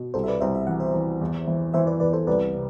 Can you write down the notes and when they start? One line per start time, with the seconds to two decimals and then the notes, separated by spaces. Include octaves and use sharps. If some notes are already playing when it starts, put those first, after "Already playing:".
Already playing: B2
0.14 C2 A4 C5
0.24 E5
0.28 B4 D5
0.41 C2 C5 E5
0.55 E5
0.67 E3 F#5
0.80 C5 E5
0.94 E3
1.21 E2
1.48 E3
1.74 E3 C5 E5
1.87 B4 D5
2.00 E2 B4 D5
2.13 A4 C5
2.27 C2 B4 D5
2.53 C3